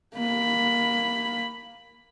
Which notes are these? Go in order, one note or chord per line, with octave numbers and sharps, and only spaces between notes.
A#3 B5